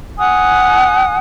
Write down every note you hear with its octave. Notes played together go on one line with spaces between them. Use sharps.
F#5 G#5 D#6 F#6